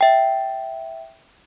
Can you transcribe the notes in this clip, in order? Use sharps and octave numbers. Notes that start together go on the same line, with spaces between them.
E5 G5